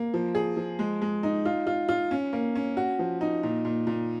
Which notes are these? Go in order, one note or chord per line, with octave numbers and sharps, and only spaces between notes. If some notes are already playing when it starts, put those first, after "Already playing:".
Already playing: A#3
F3
G#4
F3
G#3
G#3
D#4
F4
F4
F4
C#4
A#3
C#4
F#4
F3
D#4
A#2
A#2
A#2